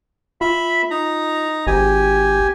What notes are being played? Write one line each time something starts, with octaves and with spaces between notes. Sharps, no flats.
F4 E5 B5
D#4 A#5
G#1 G4 G#5